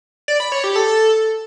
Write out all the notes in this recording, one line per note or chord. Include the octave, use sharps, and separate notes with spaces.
D5
B5
C#5
G4
A4